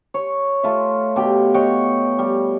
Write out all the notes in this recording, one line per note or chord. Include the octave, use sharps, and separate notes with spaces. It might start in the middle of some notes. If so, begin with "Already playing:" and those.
C#5
A3 F4 E5
B2 G4 G5
C#5 D#5 F#5 G5
G3